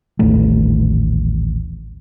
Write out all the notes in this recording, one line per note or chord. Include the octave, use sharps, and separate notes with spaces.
D#1 A1 D#2 A3